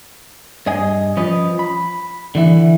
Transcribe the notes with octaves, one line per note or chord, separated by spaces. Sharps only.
G2 D#5 G#5
F3 C#4 B4 D#5
B5
D3 E3 E4